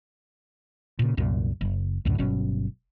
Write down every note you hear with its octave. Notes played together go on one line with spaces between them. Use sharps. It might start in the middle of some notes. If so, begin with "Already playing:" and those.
A#2 C#3
C2 F#2 A#2
F#1
C#2 F#2 A2 D3
G1 B2 F#3 C#4